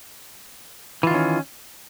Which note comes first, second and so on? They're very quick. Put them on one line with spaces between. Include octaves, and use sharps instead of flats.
E3 F4 D#3 C#4